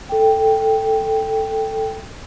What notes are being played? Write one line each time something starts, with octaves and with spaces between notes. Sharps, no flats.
A4 G5